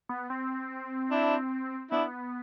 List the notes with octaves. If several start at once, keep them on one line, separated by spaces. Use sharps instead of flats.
B3
C4
D4 E4
B3 D4 E4